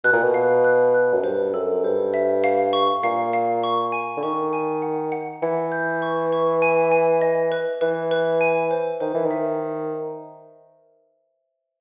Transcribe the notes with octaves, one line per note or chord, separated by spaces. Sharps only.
B2 F#6
A#2
B2
F5
F#6
F#6
F#2
G2 C5
F#2 A4
G2 C5
E5
F5
C#6
A#2 F5
F5
C#6
G#5
D3
D#3 C#6
G#5
F#5
F#5
E3 F#5
G6
C#6
C#6
G#5
G#5
D#5
B4
E3 B4
B4
G#5
C5
D#3 C5
E3
D#3 E5